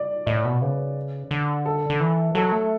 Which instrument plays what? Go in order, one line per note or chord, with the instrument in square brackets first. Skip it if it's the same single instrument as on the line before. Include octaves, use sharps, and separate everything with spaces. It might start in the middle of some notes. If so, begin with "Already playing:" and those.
Already playing: [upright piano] D5
[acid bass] A2 [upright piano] D5
[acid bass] B2
[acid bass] C#3 [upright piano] B4
[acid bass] D3
[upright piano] A4
[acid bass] D3
E3
[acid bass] F#3 [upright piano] A4
[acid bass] A3